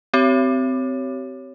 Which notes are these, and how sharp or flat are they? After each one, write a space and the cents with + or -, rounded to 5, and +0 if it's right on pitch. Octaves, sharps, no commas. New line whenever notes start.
C4 -20 G4 -30 C#5 +0